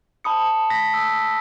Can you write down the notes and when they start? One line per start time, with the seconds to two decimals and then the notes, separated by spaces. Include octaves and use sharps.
0.24 A5 B5 D#6 C#7
0.70 A#6 B6
0.94 D#6 E6